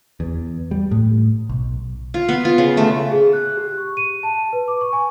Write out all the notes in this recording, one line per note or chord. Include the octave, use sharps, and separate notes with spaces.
E2
G3
A2
B1
F4
B3
F4
C#3
A3
G#4
F#6
F#6
G4
C#6
D#7
A5
A5
B4
D6
C#6
G#5